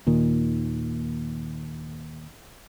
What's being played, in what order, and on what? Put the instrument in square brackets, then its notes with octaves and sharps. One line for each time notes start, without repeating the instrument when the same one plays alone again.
[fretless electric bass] D#2 A#2 D#3